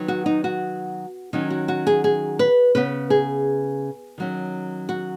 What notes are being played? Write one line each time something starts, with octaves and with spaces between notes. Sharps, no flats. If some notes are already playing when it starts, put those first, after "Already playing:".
Already playing: D#3 F#3 B3
F#4
D#4
F#4
D#3 F#3 C#4 D#4
F#4
F#4
G#4
G#4
B4
C#3 B3 B4
G#4
D#3 F#3 C#4
F#4